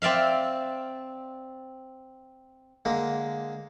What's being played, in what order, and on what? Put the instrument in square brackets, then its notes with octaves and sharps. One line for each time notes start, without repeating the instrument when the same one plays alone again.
[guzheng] C4 D5 E5 F5
[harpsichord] D3 G#3 A#3